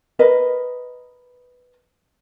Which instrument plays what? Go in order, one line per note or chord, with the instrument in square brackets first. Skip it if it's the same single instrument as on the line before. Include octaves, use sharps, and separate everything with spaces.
[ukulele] A#4 B4 D#5